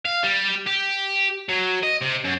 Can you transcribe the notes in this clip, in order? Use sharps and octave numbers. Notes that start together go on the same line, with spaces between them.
F5
G3
G4
F#3
D#5
C3
F#2